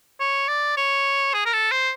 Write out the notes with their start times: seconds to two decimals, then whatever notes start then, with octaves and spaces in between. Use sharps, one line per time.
0.20 C#5
0.48 D5
0.77 C#5
1.33 G#4
1.45 A#4
1.53 A4
1.71 C5